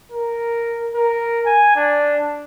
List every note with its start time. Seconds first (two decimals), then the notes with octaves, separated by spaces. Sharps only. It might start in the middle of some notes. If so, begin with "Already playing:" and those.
0.12 A#4
0.95 A#4
1.46 G#5
1.76 D4